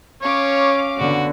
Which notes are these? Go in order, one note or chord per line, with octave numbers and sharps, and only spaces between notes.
C#4 C#5 F5 D6
D3 B3 F#4